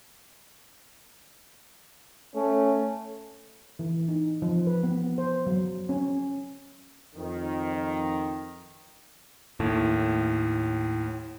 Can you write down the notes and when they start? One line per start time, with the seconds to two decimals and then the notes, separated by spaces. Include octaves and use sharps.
2.35 A3 C#4
3.79 E3
4.09 D#4
4.42 F3
4.67 B4
4.83 B3
5.18 C5
5.47 F#3
5.89 C#4
7.15 F2 D#3
9.60 D#2 A2